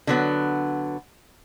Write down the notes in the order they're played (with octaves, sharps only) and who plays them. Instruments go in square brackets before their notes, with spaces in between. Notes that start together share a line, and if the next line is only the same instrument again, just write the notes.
[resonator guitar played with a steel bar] D3 F#3 B3